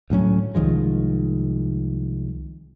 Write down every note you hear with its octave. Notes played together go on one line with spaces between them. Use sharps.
D2 A2 F#3 C#4
C2 D#3 F3 G#3